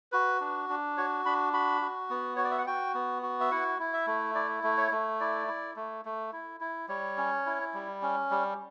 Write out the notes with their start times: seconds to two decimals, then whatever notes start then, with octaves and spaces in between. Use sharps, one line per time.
0.12 F#4 B4
0.41 D4
0.69 D4
0.97 F#4 C#5
1.25 D4 B5
1.53 F#4 B5
1.81 F#4
2.10 B3
2.36 F#4 C#5
2.44 D5
2.51 E5
2.58 F#5
2.67 F#4 G5
2.94 B3
3.22 F#4
3.40 E5
3.51 E4 F#5
3.79 E4
3.93 E5
4.07 A3
4.35 E4 D5
4.64 A3
4.77 C#5
4.92 A3
5.20 E4 D5
5.48 E4
5.76 A3
6.05 A3
6.33 E4
6.60 E4
6.89 G3 C#5
7.17 C#4
7.46 E4
7.74 G3
8.02 C#4
8.31 G3